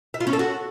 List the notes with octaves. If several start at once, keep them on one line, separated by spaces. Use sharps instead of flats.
E5
F4
C#4
A4
F#4